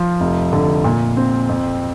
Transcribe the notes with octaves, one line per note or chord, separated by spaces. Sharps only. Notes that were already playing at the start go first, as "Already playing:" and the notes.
Already playing: F3
F1
D3
A#2
C4
F2